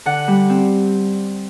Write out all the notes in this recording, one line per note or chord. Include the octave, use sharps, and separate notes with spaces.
D3 F#5
G3
C4